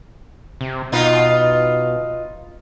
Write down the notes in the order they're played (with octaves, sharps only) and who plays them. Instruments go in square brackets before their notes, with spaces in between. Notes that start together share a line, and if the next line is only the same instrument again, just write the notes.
[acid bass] C3
[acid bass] B2 [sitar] D#4 F4 B4